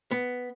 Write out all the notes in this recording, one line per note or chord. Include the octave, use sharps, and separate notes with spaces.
B3